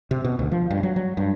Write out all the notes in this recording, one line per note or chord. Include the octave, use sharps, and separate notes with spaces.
C3
B2
D2
F3
G2
F#3
F#3
G2